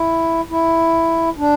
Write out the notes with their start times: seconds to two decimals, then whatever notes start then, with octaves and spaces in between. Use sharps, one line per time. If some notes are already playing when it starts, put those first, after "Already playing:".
Already playing: E4
0.50 E4
1.38 D4